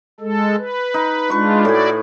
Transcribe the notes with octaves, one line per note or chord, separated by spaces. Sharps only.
G#3 A4
B4
D#4
G#3 D4 F4 B4 C#6
A2 E4 F#4 D5 G#5